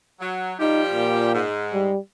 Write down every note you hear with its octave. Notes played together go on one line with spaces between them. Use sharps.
F#3
F3 G3 D#4 G4
A#2
G#2
G3